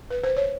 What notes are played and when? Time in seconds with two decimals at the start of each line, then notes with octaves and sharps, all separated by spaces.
0.11 B4
0.24 C5
0.37 C#5